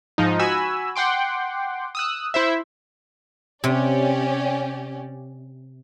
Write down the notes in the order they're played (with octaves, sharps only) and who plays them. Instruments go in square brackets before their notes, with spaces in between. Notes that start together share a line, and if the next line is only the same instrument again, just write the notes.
[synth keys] G#2 F3 D#4
F#4 G#5 B5 E6
F#5 G5 C6 D6
D#6 E6 F#6
E4 C5 E5
[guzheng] C3 [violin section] C#4 G4 D5